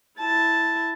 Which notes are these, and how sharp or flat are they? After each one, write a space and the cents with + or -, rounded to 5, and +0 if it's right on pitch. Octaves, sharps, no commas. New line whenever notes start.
E4 +0 A5 +0